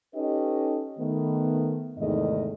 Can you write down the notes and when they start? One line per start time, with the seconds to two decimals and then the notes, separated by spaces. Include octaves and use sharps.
0.15 C#4 D#4 G4 A4 B4 D#5
0.98 D#3 A3 B3
1.98 E2 G#2 C3 D#3 A3 D#5